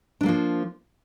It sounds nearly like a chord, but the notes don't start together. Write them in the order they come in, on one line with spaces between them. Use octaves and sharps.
D4 F#3 A#3 F3